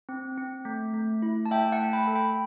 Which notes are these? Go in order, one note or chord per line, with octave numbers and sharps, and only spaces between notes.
C4
C4
A3
A3
E4
A5
A3 E5 G5
F#5 A5
A3
G5 B5
A4
G5 B5